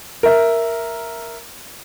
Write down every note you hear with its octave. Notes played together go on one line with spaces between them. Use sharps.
A#4 E5